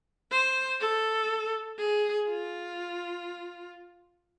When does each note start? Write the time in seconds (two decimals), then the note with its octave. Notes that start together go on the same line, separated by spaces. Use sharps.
0.32 C5
0.80 A4
1.79 G#4
2.29 F4